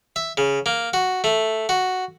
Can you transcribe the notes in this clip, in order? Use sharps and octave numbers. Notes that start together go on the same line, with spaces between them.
E5
C#3
A#3
F#4
A3
F#4